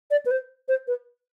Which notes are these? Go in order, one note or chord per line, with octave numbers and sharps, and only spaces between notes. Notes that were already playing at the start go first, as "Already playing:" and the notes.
D5
B4
C5
C5
B4